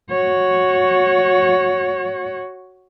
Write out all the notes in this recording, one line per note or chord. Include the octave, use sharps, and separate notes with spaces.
F#4 C#5